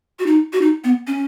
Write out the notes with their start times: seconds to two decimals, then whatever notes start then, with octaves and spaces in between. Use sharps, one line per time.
0.19 F#4
0.26 D#4
0.53 F#4
0.62 D#4
0.84 B3
1.07 C#4